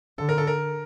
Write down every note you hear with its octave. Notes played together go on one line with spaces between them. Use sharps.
D3 A4
A#4
A4
A#4